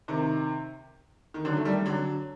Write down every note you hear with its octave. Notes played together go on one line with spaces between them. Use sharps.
C3 D#3
D#3
D3 F#3
A3
D#3 G3
D3 F#3